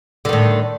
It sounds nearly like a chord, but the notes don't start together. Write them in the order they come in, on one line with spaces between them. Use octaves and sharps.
D3 D#3 A2